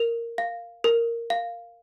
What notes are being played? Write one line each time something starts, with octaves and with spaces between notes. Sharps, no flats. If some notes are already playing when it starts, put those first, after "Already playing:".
Already playing: A#4 F7
F5
A#4
F5